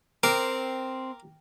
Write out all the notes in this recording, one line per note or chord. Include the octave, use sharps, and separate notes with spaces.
C4 A#4 D6